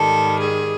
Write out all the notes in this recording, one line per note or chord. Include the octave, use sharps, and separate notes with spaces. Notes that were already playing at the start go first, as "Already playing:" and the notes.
Already playing: G#2 D#3 G3 A4
G#4